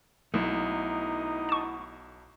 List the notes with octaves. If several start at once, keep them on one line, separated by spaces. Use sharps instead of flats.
B1 A3 B3 D#4 E4
A5 C#6